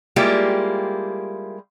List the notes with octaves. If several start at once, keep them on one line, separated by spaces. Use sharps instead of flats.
G3 G#3 A#3 E4 F4 G4